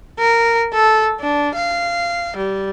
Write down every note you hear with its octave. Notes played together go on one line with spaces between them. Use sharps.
A#4
A4
D4
F5
G3